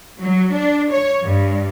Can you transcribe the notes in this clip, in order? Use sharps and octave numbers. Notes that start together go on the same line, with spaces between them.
F#3
D4
C#5
G2